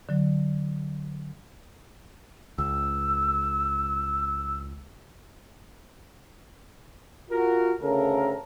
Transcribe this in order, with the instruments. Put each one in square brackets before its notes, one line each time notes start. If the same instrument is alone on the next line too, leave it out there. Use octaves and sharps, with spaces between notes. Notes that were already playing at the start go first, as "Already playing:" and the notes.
[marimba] D3 F#3
[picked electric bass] C#2 [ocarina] E6
[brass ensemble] F4 F#4 A#4
D2 C#3 A4 A#4